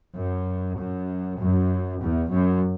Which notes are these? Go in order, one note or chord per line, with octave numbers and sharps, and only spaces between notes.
F#2
F#2
F#2
E2
F#2